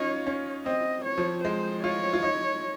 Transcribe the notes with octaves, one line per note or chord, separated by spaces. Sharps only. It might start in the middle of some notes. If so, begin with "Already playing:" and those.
Already playing: C#4 D#4 F4 C#5
C#4
C4 D#5
C#5
F3
G#3 C5
F4 C#5
F4
D#4